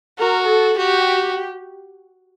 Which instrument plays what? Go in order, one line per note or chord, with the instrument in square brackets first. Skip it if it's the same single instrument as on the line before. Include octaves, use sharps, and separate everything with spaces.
[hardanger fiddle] F#4 [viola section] A#4
[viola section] A4
[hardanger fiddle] F#4 [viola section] G4